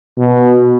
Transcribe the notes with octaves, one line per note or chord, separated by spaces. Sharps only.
B2